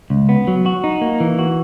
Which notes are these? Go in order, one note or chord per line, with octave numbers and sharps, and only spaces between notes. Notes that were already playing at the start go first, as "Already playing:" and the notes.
C#2
B3
F#3
F#4
D#4
A#3
E3
F#4